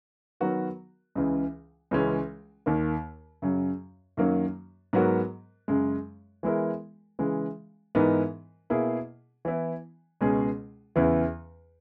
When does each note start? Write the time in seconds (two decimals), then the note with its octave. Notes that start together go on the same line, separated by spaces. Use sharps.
0.40 D#3 F#3 B3 F#4 A#4
1.15 C#2 C#3 E3
1.91 C#2 C#3 E3 G#3 C#4
2.66 D#2 D#3 A#3
3.42 F#2 C#3 F#3
4.17 F#2 D#3 F#3 A#3
4.93 G#2 F#3 B3 F#4 A#4
5.68 F#2 C#3 G#3
6.43 E3 G#3 B3 E4 A#4
7.19 C#3 E3 G#3
7.95 G#2 E3 B3 D#4 A#4
8.70 B2 A#3 E4 G#4
9.45 E3 B3 E4
10.21 C#2 B2 G#3 C#4 G#4
10.96 E2 C#3 E3 B3 E4